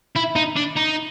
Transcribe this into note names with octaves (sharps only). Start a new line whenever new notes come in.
E4
D#4
D4
D#4